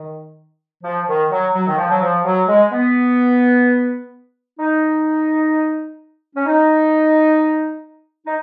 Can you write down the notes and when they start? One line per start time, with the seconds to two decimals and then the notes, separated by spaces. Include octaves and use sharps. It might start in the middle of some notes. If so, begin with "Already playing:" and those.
Already playing: D#3
0.84 F3
1.07 D#3
1.31 F#3
1.54 F#3
1.67 D#3
1.78 F3
1.90 F#3
2.01 F3
2.24 F#3
2.48 G#3
2.71 B3
4.59 D#4
6.35 C#4
6.46 D#4
8.26 D#4